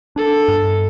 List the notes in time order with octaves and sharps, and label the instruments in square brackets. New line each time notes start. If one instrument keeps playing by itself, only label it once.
[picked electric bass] D4 [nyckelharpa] A4
[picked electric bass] G2